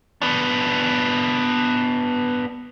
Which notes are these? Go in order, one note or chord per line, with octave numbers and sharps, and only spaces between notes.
B3 D4